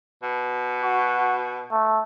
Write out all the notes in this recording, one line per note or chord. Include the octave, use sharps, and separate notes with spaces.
B2
F#4
A3